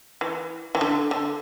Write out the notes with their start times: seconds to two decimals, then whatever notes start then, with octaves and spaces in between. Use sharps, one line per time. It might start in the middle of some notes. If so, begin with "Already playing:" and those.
0.21 E3
0.75 E3
0.81 D3
1.11 D3